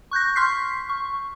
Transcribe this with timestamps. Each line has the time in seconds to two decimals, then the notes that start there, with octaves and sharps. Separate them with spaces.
0.11 C#6 F#6 G6 A#6
0.36 C6 C#6 F6 G6 B6 C7
0.89 C#6